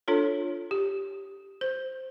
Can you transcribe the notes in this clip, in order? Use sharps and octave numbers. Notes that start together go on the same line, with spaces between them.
D4 F4 A4 C#5
G4
C5